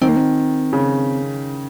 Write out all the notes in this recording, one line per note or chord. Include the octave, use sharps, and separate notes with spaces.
D#3 C4
A#3
C4
C#3